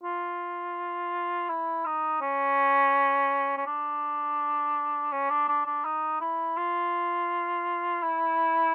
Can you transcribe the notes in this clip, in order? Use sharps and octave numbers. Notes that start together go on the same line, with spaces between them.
F4
E4
D#4
C#4
C#4
D4
C#4
D4
D4
D4
D#4
E4
F4
E4